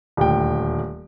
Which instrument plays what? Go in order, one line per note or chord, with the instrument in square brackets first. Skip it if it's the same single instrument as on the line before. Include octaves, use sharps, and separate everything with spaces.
[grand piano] D#1 D2 G5